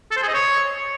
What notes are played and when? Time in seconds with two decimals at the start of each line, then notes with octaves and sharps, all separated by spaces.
0.11 A4
0.17 C5
0.22 G#4
0.28 D#5
0.34 C#5